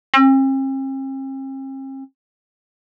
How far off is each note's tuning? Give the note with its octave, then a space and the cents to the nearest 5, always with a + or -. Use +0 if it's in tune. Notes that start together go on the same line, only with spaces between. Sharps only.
C4 +45